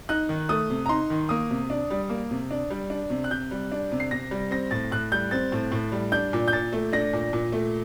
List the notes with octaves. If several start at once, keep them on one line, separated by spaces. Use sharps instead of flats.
D#4 F#6
D#3
A3 D#6
C3
A#5
D#4 C6
D#3
A#3 D#6
C3
D4
G3
A#3
C3
D4
G3
D4
C3
F#6
C3 G6
G3
D4
C3
C7
C3 A#6
G3
C4 A#6
A2 A6
A2 F#6
G3 G6
C4 A6
A2
A2
G3
D4 G6
A#2
G6
A#2 A6
A3
D4 A#6
A#2
A#2
A3